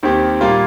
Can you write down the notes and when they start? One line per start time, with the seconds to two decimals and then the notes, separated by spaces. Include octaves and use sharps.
0.03 D#2 D#3 C4 G4
0.41 A#2 G3 A#3 F4